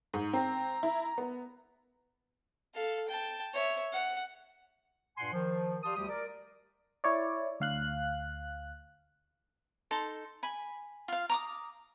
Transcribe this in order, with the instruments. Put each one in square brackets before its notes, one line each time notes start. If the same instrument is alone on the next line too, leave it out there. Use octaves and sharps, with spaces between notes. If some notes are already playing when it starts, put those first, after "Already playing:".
[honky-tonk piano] G#2
[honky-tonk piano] C4 [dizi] A#5
[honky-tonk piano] E4
B3
[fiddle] A4 F5
G5 A5
C#5 E5
F#5
[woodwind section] G2 A#2 F#5 G#5 C6
D#3 F3
G4 D5 F5 A5 C6 D#6
D2 G3 G4 D#6
A#4 D5
[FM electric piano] E4 C#5 D5
D2 F5 F#6
[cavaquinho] D#4 A4 C6
G#5 B5
F4 F5
A#5 D6 D#6